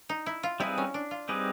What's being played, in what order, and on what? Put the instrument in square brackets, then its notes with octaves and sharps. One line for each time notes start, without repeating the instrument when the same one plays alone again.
[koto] D#4
E4
F4
[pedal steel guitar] G3 C4 D#4 G#4 B4 [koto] E4
[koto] C#4
D4
F4
[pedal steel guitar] G3 C4 D#4 G#4 B4 [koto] G4